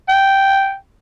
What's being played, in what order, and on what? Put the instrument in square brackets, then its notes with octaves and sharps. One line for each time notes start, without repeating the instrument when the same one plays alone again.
[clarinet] G5